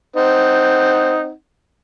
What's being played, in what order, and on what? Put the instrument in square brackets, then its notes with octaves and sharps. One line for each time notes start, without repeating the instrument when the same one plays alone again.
[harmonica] C4 D#4 F#5